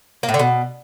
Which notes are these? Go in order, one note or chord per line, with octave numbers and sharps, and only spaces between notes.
A#3
A2
D3
B2